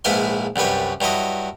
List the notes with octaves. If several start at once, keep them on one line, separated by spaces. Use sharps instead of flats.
A#1 G#2 E4 B4 F5 C6
C2 F#2 G3 B4 C#5
G2 F#3 E4 D#5